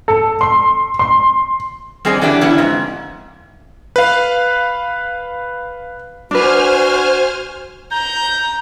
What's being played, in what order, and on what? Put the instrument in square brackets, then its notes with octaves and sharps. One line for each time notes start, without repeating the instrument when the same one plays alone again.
[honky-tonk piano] A4
C6
C6
[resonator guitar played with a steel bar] G3 C4 G#4 D5 D#5
D3 E3 F#3 D4 G4
D3 B3 C#4 E4
F2 G#2
[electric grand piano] B4 F5
[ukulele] D4 B4 [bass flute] F#4 [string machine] C5 G#5 F6
[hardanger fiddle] A#5 [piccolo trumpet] G6